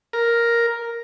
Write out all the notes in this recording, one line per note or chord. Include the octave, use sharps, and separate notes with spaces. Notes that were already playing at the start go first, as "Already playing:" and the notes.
A#4